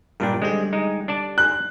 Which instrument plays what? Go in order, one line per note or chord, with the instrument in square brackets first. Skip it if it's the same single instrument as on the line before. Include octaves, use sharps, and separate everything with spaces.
[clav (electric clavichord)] G2 A#2 D4 [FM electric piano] A#4 G5
[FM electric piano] D3 G3 G4 [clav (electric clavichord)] G#3 C4
[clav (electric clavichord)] G#3 D#4
D4 D5 A5
[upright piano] F#6